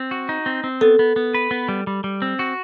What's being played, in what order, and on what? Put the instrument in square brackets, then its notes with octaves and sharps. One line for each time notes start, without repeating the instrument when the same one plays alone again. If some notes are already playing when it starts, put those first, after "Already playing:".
Already playing: [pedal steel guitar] C4
F#4
D#4
C4
C4
[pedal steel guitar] B3 [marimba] A4
[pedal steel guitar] B3
B3
B4
B3
G3
G3
G3
C4
F#4